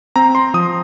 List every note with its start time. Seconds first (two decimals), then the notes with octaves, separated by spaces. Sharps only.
0.16 C4 A#5
0.35 C6
0.54 F3 D#6